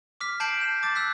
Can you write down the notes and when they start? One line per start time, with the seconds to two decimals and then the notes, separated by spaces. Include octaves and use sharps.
0.21 D6 F6 B6
0.40 A5 G6 B6 C7 D7 F#7
0.61 E7
0.82 A5 D6 A6
0.95 E6 F#6 B6